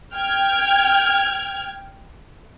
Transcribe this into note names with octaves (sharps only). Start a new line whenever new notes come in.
G5 F6 G#6